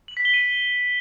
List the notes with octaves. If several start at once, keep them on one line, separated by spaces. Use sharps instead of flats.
F#7
B6
G7
D#7